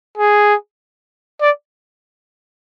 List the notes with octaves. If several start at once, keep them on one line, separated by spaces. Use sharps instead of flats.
G#4
D5